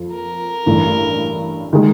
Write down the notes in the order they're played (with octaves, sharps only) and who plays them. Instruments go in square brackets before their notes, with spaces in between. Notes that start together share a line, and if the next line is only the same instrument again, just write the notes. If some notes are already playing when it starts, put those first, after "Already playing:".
Already playing: [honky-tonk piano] F2 F3
[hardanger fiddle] A#4
[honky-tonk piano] A1 G2 E3 A3
D#3 G#3